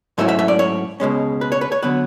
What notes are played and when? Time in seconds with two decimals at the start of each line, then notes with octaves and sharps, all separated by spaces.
0.18 G#2 F#3 A3 C#4 E4 E5
0.29 E5
0.39 E5
0.48 D5
0.59 C#5
1.00 C#2 B2 G#3 C#4
1.41 B4
1.52 C#5
1.61 B4
1.72 C#5
1.83 D3 F#3 B3 B4